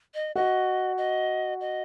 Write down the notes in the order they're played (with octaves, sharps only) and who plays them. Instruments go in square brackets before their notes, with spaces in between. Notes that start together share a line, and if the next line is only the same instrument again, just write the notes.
[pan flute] D#5
[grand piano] F#4 [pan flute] D#5
[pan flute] D#5
D#5